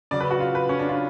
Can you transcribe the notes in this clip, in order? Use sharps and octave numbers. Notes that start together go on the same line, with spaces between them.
C#3 F#3 D5
B4
F#4
F4
B4
C#4
D4
F4